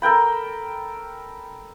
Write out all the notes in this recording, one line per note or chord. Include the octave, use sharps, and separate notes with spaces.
A4 A#4 G5 B5